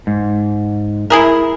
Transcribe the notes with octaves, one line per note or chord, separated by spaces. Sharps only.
G#2
E4 G#4 A#4